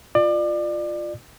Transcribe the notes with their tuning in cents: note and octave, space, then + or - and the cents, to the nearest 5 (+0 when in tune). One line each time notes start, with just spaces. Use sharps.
F4 -5 D5 +30